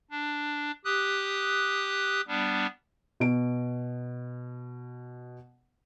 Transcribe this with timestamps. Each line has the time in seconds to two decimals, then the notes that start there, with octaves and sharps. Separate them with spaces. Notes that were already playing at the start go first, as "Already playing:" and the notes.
0.11 D4
0.85 G4 D#6 F#6
2.28 G3 B3 D4
3.20 B2 D7